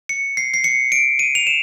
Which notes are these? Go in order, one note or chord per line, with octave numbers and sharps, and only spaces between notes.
C#7
C7
C7
C#7
D7
D#7
F7
E7